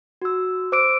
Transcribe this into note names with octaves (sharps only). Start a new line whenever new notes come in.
F#4 E6
C5 D6 E6 D7